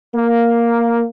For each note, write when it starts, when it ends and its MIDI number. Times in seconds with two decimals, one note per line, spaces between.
0.15 1.05 58